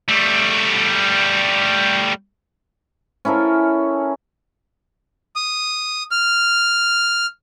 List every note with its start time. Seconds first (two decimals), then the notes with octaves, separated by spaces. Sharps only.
0.08 G3 A3
3.25 C#4 E4 A4 A#4
5.36 D#6
6.11 F6